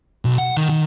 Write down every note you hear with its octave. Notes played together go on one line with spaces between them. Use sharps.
B1
F#5
D#3
D#3